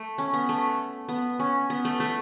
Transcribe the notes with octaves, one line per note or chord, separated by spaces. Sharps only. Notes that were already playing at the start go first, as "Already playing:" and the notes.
Already playing: A3
C#4
B3
A3
B3
C#4
B3
A3
A3